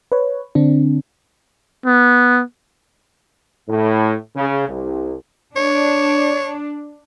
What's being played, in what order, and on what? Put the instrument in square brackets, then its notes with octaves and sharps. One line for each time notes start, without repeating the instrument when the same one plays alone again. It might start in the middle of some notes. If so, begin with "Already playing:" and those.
[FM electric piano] B4 C#5
D3 C4 D4
[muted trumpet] B3
[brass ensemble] A2
C#3
C2
[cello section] D4 [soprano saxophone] C#5